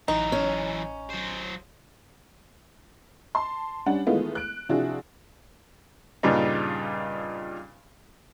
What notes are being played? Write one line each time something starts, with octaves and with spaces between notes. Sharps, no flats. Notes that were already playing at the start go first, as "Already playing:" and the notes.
A1 E3 F#3 D#4
C#4
F#3 C5
A5 C6
G3 C#4 D4 F#5
D#3 E3 G#3 A3 B3 F4
F#6 D7
C3 F3 D4 E4 F#4 G#4
G2 A#2 C#3 G3 D#4